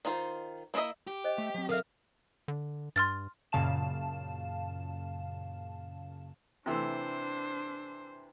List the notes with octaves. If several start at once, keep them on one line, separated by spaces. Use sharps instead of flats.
D#3 D#4 F4 C5
A#3 E4 F4 D#5 E5
G4
C5 D#5
A3 E5
F#3 C4
B2 A4 A#4 E5 F5 F6
D3
G2 C6 F6 A6
F#2 A#2 C#3 F5 A5 E7
C3 E3 A3 D4 C5